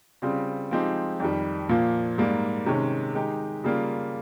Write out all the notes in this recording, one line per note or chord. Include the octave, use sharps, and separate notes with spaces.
C#3 G3 C4 F4
F3 G#3 C4 D#4 G4
F2 D#3 G3
A#2 F3 A#3
G#2 G3 A#3
C3 D#3 G#3 C#4
D#3 G#3 D#4 G4
C#3 G3 A#3 F4